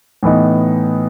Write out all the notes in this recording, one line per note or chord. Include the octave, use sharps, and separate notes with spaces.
A2 E3 B3 D#4